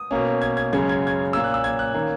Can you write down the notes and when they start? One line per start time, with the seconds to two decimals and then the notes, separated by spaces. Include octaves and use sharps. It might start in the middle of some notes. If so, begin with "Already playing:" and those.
Already playing: D#6
0.11 B2 A#3 C#4
0.42 G#6
0.57 G#6
0.73 F#2 C#3 G#3 C#4 G#6
0.89 G#6
1.07 G#6
1.33 A#2 A#3 C#4 E6
1.44 F#6
1.54 E6
1.64 G#6
1.79 F#6
1.94 D#3 A#3 C#4